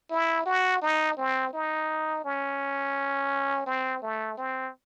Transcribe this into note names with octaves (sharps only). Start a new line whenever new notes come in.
E4
F#4
D#4
C4
D#4
C#4
C4
A3
C4